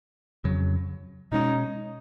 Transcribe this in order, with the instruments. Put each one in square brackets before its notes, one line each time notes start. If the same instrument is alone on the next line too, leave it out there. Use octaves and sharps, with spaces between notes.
[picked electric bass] F2 C#3 F#3
[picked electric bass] B2 G#3 C#4 [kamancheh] D#4